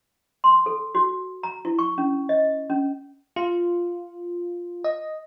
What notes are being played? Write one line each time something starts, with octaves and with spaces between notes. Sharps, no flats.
C6
A4
F#4
A#5
E4
C#6
C#4
D#5
C#4
F4
D#5